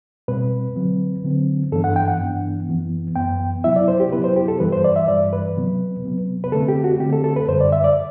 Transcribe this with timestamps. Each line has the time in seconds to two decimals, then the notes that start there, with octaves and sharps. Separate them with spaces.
0.28 B2 G3 C4 B4
0.76 D3 F#3 C4
1.24 D3 F#3 C4
1.72 G2 E3 B3 D4 A4
1.84 F#5
1.96 G5
2.08 F#5
2.20 G2 E3 B3 D4
2.68 F#2 E3 B3
3.16 F#2 E3 B3 G5
3.64 C3 F#3 B3 E4 E5
3.76 D5
3.88 C5
4.00 G4
4.12 C3 F#3 B3 E4 B4
4.24 C5
4.36 G4
4.48 A4
4.60 G2 E3 G3 B4
4.72 C5
4.84 D5
4.96 E5
5.08 G2 E3 G3 D5
5.33 B4
5.56 C3 F#3 B3
6.04 C3 F#3 B3
6.44 B4
6.52 D3 A3 C4 A4
6.68 G4
6.84 F#4
7.00 D3 A3 C4 G4
7.13 A4
7.24 A4
7.36 B4
7.48 F#2 D3 G3 C5
7.61 D5
7.72 E5
7.84 D5